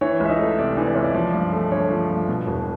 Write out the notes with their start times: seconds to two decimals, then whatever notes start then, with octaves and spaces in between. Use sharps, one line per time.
0.01 E3 C#5
0.20 C#2 E5
0.29 D#4 D#5
0.39 A3
0.59 C3 D5
0.77 E3
0.86 D5
0.95 C#2 C#5
1.04 D5
1.14 F3 D5
1.34 G2
1.53 A3
1.71 D3 C#5
1.91 F3
2.09 G2
2.28 B2
2.47 E1